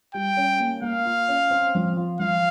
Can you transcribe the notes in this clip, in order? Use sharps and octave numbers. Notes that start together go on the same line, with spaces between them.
G3 G5
C#4
A#3
A#3 F5
F4
C#4
C4
F3
F4
F3 F5